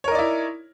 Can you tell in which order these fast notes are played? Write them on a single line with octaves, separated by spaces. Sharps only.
C#5 A#4 D#4 D5 E4